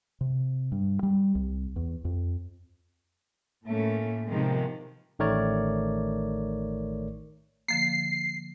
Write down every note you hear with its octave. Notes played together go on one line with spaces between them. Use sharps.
C3
G2
G3
C2
E2
F2
A2 A3 A#3 C#4
C3 D#3 F3 G#3 B3 C4
A1 D#3 A3 A#4 C#5 D5
D3 F3 A#3 C7